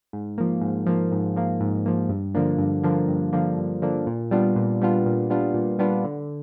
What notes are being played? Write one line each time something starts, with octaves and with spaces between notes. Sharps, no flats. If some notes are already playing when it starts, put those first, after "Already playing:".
G#2
F3 A#3
G#2
F3 A#3
G#2
F3 A#3
G#2
F3 A#3
G2
D3 F3 A#3 D4
G2
D3 F3 A#3 D4
G2
D3 F3 A#3 D4
G2
D3 F3 A#3 D4
A#2
G3 B3 D4 F4
A#2
G3 B3 D4 F4
A#2
G3 B3 D4 F4
A#2
G3 B3 D4 F4
D3